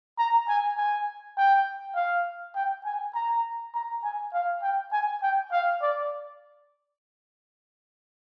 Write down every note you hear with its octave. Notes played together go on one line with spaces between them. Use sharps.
A#5
G#5
G#5
G5
F5
G5
G#5
A#5
A#5
G#5
F5
G5
G#5
G5
F5
D5